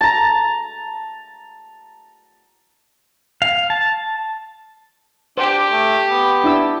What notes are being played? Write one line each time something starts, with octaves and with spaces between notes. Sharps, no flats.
A5 A#5
F5
A5
D4 G4 C5
A3
B3
D4 E4 E6